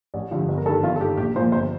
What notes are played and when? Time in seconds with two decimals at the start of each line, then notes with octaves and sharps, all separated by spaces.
0.14 A1 D5
0.31 G2 D3 F3
0.49 G1
0.58 A#4
0.66 G2 D#3 A4
0.83 G1 F4
0.96 A4
1.00 G2 D#3 G4
1.17 A#1 G4
1.36 A#2 F3 C5
1.52 G1 C5